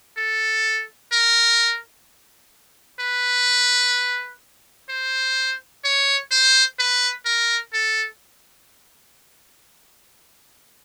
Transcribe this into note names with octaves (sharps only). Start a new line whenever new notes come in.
A4
A#4
B4
C5
C#5
C5
B4
A#4
A4